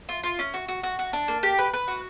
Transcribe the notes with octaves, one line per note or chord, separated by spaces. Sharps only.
F4
F4
C#4
F#4
F#4
F#4
F#4
D4
A#3
G4
B4
B4
F#4